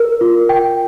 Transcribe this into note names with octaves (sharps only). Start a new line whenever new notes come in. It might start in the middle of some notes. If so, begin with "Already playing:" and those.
Already playing: A#4
F4
G5